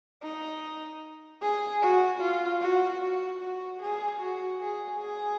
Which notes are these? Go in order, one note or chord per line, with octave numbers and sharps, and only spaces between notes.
D#4
G#4
F#4
F4
F#4
F#4
F#4
G#4
F#4
G#4
G#4